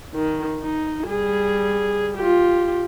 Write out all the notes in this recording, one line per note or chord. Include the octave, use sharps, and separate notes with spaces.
D#3
D#4
G3 G#4
F4 G4